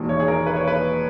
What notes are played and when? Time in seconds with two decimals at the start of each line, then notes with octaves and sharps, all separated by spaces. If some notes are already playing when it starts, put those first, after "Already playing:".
Already playing: E1 D#2 D#3
0.09 C#5
0.20 G#4
0.28 A#4
0.46 B4
0.56 C#5
0.67 B4